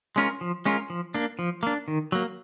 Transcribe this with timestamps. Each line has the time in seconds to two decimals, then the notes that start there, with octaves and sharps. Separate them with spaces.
0.16 G#3 C#4 F4 A#4
0.41 F3
0.65 G#3 C#4 F4 A#4
0.90 F3
1.14 A#3 D4
1.39 F3
1.63 A#3 D4
1.88 D#3
2.12 F#3 A#3